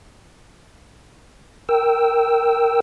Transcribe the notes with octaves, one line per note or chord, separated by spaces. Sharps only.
A#4 G5 E6